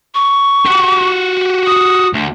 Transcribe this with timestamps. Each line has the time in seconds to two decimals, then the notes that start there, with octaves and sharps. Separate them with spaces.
0.15 C#6
0.66 F#4 G4
1.66 D#6
2.14 D2